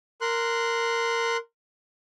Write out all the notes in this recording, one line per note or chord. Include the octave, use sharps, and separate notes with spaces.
A#4 C6 F#6